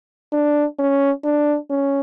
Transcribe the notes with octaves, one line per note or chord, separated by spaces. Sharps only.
D4
C#4
D4
C#4